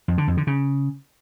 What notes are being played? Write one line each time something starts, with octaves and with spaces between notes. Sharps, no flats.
F2
D3
F2
D3
C#3